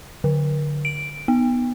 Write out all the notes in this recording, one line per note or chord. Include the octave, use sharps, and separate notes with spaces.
D3
D7
B3